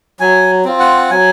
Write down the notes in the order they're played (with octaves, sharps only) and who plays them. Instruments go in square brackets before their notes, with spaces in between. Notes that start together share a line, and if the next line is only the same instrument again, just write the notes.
[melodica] F#3 G#5
C4 F4
F#5
F#3 G#5